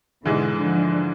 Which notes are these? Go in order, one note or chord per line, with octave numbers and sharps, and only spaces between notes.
G#2 B2 D3 E3 G#3
D3 F3